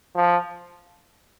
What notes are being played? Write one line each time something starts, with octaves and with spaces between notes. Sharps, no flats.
F3